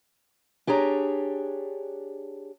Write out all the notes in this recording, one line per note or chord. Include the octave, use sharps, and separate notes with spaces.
D4 G4 G#4 C#5 A#5